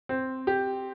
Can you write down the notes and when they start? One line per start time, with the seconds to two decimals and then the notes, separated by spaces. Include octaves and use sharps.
0.09 C4
0.47 G4